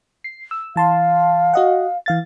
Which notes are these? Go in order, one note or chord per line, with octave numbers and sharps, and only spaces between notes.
C7
E6
E3 F5 A5 C6
F#4 D#5 F#5
E3 F5 A6